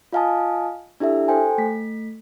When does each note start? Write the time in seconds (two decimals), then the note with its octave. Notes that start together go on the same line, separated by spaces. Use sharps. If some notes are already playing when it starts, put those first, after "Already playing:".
0.12 F4 D#5 F5 G#5 A5 D#6
1.00 D4 E4 G4 A4 E5
1.28 A4 C5 G5 G#5
1.58 A3 B6